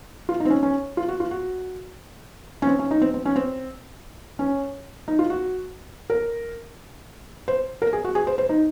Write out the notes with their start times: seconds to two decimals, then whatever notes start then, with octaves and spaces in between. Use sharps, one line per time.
0.29 F4
0.40 D#4
0.45 C4
0.50 C#4
0.63 C#4
0.97 F4
1.08 F#4
1.20 F4
1.31 F#4
2.62 C#4
2.67 C4
2.79 C#4
2.91 D#4
3.02 C4
3.14 C4
3.25 C#4
3.36 C4
4.39 C#4
5.08 D#4
5.19 F4
5.30 F#4
6.10 A#4
7.48 C5
7.82 A#4
7.93 G#4
8.04 F#4
8.15 G#4
8.27 C5
8.38 C5
8.49 D#4